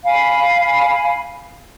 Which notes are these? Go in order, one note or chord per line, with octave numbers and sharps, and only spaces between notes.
F5 G#5 B5